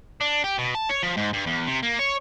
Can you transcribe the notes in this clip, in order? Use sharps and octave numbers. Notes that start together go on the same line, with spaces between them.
D4
G4
B2
A5
C#5
F3
G#2
G2
E2
C3
A#3
C#5